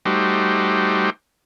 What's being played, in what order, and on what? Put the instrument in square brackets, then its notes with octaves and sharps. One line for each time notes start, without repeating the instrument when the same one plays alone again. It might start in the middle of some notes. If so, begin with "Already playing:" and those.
[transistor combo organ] G3 A3 D#4 F#4 G4 C5